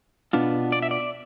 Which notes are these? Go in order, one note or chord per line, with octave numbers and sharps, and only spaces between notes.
B2 B3 D4 F4
D5
E5
D5